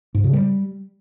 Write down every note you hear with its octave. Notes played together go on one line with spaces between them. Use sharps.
G#2
C#3
G3